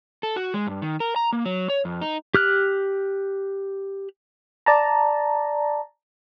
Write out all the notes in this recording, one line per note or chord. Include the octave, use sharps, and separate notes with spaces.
A4
F#4
G#3
G2
D#3
A#4
A#5
A#3
F#3
C#5
F2
D#4
G4 F6 F#6
D5 A5 A#5